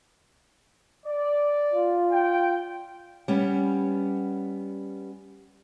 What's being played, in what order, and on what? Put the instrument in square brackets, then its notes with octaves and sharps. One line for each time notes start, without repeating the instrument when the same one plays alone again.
[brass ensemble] D5
[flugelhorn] F4
[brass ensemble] G5
[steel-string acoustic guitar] G3 B3 C#4